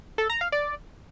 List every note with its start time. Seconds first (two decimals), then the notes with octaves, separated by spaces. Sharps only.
0.18 A4
0.30 A#5
0.41 F5
0.52 D5